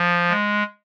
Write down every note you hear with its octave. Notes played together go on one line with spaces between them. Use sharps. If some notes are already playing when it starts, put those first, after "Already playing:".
Already playing: F3
G#3